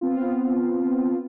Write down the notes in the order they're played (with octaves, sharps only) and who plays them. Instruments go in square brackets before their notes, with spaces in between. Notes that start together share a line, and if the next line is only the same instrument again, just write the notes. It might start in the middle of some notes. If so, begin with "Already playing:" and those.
[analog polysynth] B3 C4 F4